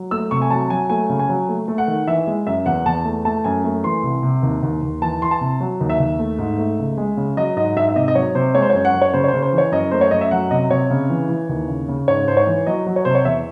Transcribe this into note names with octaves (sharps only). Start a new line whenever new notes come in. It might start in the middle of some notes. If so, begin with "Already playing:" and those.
Already playing: F#3
A3 E6
C3 C#6
G#5
F#3 A5
F#3 G#5
A3 G#5
C#3
G#5
F#3
A3
A3
F#5
D#3
E3 E5
G#3
F#2 E5
E2 F#5
E2 A5
A3
A3 A5
F#2 G#5
A3
E3 C6
C2
C3
D#2
D#2
D#2
E3 A5
E3 C6
A5
C3
F#3
D#2
E5
D#2
A3
G#2
A3
C#2
G#3
C#3
F#3 D#5
G#2 D#5
G#2 E5
E5
C3 D#5
D#5
F#3 C#5
C3 C5
G#3 C#5
C5
F#2 C#5
F#5
F#2
C#5
C#3 C5
C#5
C5
C#3
C5
E3
C#5
F#2 D#5
A3 C5
C#5
F#2 D#5
E5
F#3 F#5
C3 D#5
C3 C#5
C#3
E3
E3
D#2
C#3
C#3
G#2 C#5
G#2 C5
C#5
E3
F#3 D#5
F#3
C#5
C3 C5
C#5
E2 E5